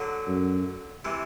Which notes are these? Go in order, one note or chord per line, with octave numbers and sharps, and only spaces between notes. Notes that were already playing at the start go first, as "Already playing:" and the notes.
Already playing: D3 F#3
F#2
C3 E3